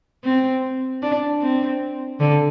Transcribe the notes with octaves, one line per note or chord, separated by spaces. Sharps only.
C4
D4
C4
D3